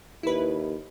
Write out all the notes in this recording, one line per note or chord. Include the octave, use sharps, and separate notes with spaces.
D#2 E4 B4